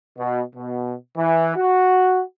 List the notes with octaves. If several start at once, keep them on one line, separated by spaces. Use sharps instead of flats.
B2
B2
E3
F#4